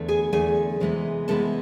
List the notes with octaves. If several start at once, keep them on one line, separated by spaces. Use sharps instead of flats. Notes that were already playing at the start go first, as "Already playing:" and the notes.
Already playing: E2 D3 A3
G#4 G#5
E2 D3 A3 G#4 G#5
C3 E3 G#3 B3
C3 E3 G#3 B3 A4 A5